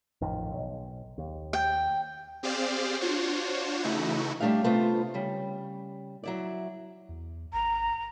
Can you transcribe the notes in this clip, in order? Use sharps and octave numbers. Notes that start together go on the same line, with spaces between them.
A1 F2 D#3
B1
D#2
G5
C4 G4 G#4 C5 D5 F5
D4 F4 F#4 C5 C#5
C#3 E3 A3 D#4 E4 F#4
G3 A3 C4 D4 G4 F5
C3 A3 B3 F4 C5
C#3 G3
F#3 E4 D5
E2
G#1 A#5